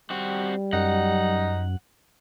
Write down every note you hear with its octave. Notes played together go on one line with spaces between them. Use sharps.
G3 C4 F#4
F#2 D#4 F#5